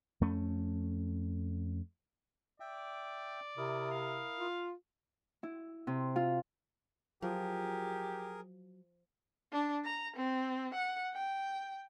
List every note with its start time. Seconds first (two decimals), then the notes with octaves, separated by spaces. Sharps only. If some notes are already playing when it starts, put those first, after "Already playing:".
0.21 F2 A3 C#4
2.60 D5 E5 G5
3.57 C3 E4 A#4 D#6
3.90 F5
4.37 F4
5.43 E4
5.87 C3
6.16 F4
7.22 F3 F#3 G4 G#4 A#4
9.52 D4
9.85 A#5
10.17 C4
10.74 F#5
11.14 G5